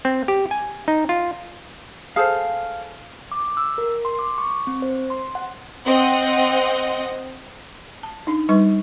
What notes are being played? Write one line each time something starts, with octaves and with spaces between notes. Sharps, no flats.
C4
G4
G#5
D#4
F4
G#4 A4 C5 F5
D6
E6
A#4
C6
D6
C#6
C4
C5
C6
F#5
C4 D#5 F#5
A5
D4 D#4
G3 D#4 B4 C#6